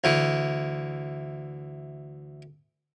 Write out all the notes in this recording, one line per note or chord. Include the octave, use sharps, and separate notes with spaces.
D2 E3